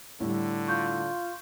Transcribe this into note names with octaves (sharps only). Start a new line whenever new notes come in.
A2 D3 G3
F4 C#6 G6